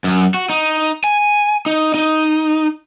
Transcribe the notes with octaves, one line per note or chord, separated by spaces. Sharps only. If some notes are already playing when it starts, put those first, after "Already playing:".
F#2
F#4
D#4
G#5
D#4
D#4